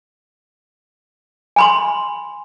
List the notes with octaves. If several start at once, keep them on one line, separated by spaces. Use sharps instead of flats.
G#5 B5 C6